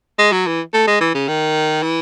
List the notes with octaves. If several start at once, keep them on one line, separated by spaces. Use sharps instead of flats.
G#3
F#3
E3
A3
G#3
E3
C#3
D#3
E3